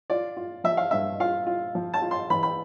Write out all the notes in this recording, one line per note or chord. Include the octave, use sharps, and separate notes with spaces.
F4 D5
F4
F3 E5
F5
G2 E5
F4 F5
F4
F3
A5
F4
C6
E3 B5
B5